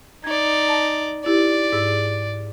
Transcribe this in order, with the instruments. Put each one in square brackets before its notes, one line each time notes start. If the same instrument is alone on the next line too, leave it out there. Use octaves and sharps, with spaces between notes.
[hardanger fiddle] D#4 D5 [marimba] G#6
[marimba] A5
[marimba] D#4 E4 G4 [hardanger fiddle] D5
[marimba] G#2 G#4 E6